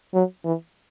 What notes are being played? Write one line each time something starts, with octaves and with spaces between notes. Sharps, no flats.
F#3
E3